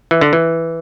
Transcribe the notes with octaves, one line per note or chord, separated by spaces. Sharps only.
E3
D3
E3